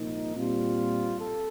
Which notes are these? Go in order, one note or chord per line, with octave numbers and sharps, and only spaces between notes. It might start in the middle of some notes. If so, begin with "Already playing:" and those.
Already playing: C2 A#2 F3 A#3 D#4
A#2 G3 C4 F4
A4